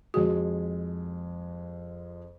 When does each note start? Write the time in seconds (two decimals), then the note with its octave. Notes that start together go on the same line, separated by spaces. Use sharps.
0.14 F2 G#3 F#4